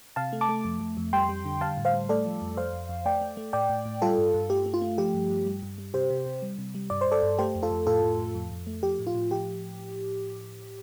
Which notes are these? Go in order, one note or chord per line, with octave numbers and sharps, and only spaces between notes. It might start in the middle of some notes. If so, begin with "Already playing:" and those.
C3 F5 A5
A3
A5 D6
A3
F2
F2
F2
G3 G5 C6
G3
D3
G3 F5 A5
A2
C5 F5
G3
A3 A4 D5
F3
F2
F2 C5 F5
F2
F2
A3 D5 G5
A3
A3
A2 D5 G5
A2
A2
G3 F4 A4
G2
G2
A3 G4
A3
F4
A3
F3 G4
G2
G2
G3
G2
G3
C3 G4 C5
C3
C3
G3
C3
G3
G2 D5
C5
G2
A4 D5
G2
A3 G4 C5
F2
F4 A4
F2
A2 F4 A4
A2
A2
F2
F2
A3
F3 G4
A2
F4
A2
F3 G4